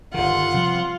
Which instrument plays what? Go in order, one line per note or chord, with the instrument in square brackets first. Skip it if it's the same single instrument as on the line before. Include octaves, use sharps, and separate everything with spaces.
[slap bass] G1 D#3 [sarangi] F4 [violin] F#5
[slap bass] C3 F3 G3